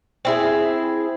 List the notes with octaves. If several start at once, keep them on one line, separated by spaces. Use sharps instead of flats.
C4 E4 G#4